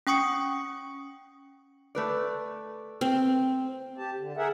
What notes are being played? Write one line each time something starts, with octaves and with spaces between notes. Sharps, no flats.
C#4 G5 C#6 D#6 C#7
A3 B4 D5
C4
G4 A5
D3
G#4 A#4 E5 F#5